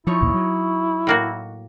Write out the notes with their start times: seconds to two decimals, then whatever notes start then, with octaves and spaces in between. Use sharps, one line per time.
0.07 F3 D#4 E4 C#5 C#6
0.21 A1 D2 A#2
0.34 F#3
1.07 A2 A#3 F#4